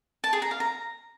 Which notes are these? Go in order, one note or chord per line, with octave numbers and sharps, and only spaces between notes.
A5
G#4
A#5
F5
A#5